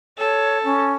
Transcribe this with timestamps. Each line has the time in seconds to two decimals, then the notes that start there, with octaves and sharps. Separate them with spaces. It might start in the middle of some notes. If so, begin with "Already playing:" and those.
0.18 A4 C#5
0.64 C#4